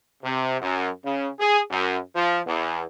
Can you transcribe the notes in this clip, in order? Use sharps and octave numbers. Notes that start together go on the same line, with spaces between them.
C3
F#2
C#3
G#4
F#2
F3
E2